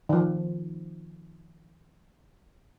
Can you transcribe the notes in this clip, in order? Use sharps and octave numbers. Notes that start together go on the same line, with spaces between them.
D#3 F3